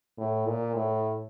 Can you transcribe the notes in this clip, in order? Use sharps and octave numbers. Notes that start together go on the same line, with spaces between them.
A2
A#2
A2